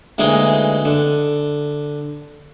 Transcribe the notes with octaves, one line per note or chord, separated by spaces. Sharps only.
D2 E3 G#3 A#3 D#4 G5
D3